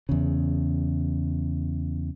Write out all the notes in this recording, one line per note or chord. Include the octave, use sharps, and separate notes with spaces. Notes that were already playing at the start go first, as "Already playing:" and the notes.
E2 C#3